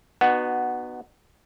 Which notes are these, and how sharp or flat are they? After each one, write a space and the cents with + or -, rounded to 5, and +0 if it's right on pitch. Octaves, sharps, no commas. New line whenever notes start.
B3 +0 D#4 -40 F#4 +0